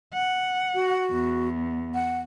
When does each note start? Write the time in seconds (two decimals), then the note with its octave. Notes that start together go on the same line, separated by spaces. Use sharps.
0.14 F#5
0.75 F#4
1.11 E2
1.94 F#5